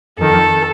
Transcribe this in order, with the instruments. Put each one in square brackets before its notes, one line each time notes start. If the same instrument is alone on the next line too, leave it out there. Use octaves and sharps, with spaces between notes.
[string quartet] F2 D#3 A4